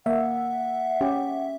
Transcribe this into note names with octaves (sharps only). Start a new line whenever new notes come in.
A#3 E5 F#5
C#4 G4